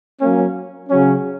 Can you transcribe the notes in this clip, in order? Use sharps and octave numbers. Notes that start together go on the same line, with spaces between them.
F#3 A#3 C#4
C#3 F#3 C#4